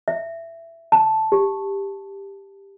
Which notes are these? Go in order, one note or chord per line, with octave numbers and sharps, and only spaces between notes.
E5
A5
G4